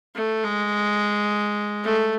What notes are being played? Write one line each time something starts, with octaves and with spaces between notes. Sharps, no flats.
A3
G#3
A3